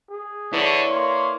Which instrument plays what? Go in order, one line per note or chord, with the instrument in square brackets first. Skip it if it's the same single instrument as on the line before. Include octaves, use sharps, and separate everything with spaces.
[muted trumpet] G#4
[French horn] D3 [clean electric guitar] E4 B4 D5 [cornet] C#5
[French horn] A#3 [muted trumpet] C6